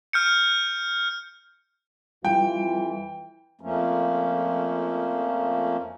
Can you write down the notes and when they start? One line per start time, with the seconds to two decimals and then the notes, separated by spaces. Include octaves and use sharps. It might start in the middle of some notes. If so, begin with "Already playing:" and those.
0.13 F6 G6 C#7
2.25 F2 E3 G3 F4 G5
3.61 F2 F3 A3 A#3 C#4